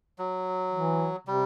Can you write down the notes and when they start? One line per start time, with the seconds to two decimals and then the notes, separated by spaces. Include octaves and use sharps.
0.18 F#3
0.73 E3
1.27 C3 G3